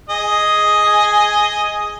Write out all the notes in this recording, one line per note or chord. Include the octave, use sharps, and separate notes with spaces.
G#4 D#5